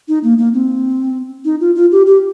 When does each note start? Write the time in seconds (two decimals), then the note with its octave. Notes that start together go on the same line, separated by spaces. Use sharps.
0.08 D#4
0.24 A#3
0.38 A#3
0.54 C4
1.45 D#4
1.61 F4
1.75 F4
1.92 G4
2.07 G4